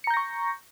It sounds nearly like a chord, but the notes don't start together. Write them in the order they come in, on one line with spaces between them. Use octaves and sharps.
C#7 A#5 G6 A#6 C#6